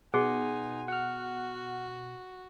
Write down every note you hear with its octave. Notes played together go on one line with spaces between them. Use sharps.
B2 D#4 G#4 F#5 G#5 C6
F#4 F#5 F6